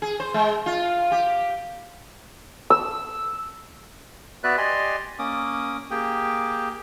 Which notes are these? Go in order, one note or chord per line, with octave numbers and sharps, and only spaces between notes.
G#4
C5
G#3
F4
G4
E6
B3 F#4 B4 D5 E5 F#6
G4 D5 D#5 G#5 C6
A#3 C#4 D6 D#6
A#3 G4 G#4 G5